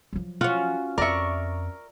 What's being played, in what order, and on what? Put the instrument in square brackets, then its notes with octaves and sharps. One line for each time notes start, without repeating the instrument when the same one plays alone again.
[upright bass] F3 F#3
[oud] C#4 F#4 [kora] F4
[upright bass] F2 [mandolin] A#4 C#6 [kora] D5 E5